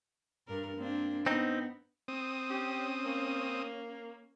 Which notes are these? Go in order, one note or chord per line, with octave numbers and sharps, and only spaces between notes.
G2 D4 A#4
A#3 C4 D4
B3 C4 D#4
C4 D#6
C#4 G4
A#3